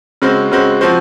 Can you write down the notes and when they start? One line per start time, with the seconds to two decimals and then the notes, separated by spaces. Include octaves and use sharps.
0.22 C#3 G#3 C4 F#4 C5
0.51 C#3 G#3 C4 F#4 C5
0.81 F3 C4 F#4 C5